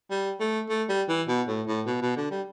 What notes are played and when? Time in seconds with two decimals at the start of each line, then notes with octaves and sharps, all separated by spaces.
0.11 G3
0.40 A3
0.70 A3
0.89 G3
1.09 E3
1.28 B2
1.48 A2
1.67 A2
1.87 B2
2.02 B2
2.17 D3
2.31 G3